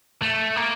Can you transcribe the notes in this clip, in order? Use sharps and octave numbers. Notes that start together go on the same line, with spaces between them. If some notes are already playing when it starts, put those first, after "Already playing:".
A3
A#3